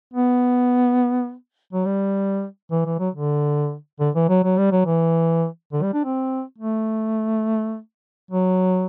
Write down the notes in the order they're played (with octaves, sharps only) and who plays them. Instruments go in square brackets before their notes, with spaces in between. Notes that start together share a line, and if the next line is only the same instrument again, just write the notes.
[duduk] B3
F#3
G3
E3
E3
F#3
D3
D3
E3
F#3
F#3
G3
F#3
E3
D3
G3
D4
C4
A3
F#3